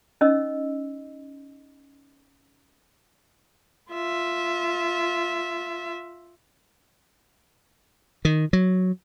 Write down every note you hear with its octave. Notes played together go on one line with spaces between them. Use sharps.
C#4 D#4 D#5 E6
F4 E5
D#3
F#3